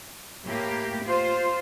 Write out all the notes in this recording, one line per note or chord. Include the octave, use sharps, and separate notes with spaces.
A2 A#3 G4
F4 C5